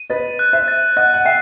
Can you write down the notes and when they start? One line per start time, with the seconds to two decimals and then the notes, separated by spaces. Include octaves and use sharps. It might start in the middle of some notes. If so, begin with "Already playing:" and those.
Already playing: D#7
0.10 B4 D#5 A6
0.39 F#6
0.53 C5 E5
0.68 A6
0.97 D#5 F#5 F#6
1.14 F#5
1.25 E5 G5 C7